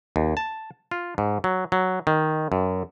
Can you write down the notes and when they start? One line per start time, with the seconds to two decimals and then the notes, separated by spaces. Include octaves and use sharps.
0.16 D#2
0.37 A5
0.91 F4
1.18 G#2
1.44 F#3
1.72 F#3
2.07 D#3
2.52 F#2